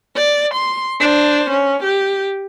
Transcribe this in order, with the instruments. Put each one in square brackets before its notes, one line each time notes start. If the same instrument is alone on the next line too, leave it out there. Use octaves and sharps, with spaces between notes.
[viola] D5
C6
D4 C5
C#4
G4